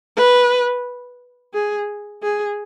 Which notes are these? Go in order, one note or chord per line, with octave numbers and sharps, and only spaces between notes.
B4
G#4
G#4